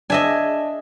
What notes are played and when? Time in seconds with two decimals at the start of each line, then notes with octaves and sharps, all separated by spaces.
0.10 D4 D#5 E5 G#5